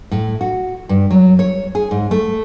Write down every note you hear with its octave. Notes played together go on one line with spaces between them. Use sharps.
A2
F#4
G2
F#3
C#5
G#4
G#2
A3